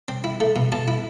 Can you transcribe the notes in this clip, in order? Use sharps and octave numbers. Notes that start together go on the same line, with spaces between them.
C4
E4
A3
B2
B2 A5
E4